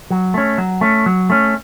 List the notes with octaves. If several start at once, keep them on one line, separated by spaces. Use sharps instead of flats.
F#3
A3 C#4
F#3
A3 C#4
F#3
A3 C#4